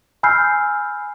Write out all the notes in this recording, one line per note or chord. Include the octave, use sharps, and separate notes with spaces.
G#5 B5 E6 F6 G6 C7